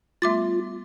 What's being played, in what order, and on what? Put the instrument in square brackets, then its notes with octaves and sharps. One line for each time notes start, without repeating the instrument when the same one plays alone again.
[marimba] G3 A3 B3 [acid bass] F4 [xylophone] E5 D6 A6